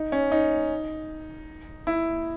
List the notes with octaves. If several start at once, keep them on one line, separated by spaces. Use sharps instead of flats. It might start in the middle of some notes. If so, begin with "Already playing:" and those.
Already playing: D#4
C#4
D#4
E4